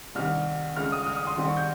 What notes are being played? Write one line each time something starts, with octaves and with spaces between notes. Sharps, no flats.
C2 C3 D#3 F6
C#2 C#3 F6
D#6
F6
D#6
C6
C2 C3 D#3
C#6
G6